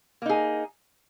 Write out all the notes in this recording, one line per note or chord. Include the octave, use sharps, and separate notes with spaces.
A#3 D#4 G#4